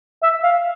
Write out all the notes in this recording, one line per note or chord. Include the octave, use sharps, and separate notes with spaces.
E5
F5